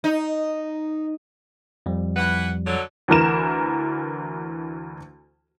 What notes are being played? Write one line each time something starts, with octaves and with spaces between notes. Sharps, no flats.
D#4
F2 F3 G3
E3 B4 F#5
D3 F#3
D2 E3 A#4 E7